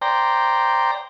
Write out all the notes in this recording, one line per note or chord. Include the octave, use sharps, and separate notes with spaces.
C5 D5 G5 A#5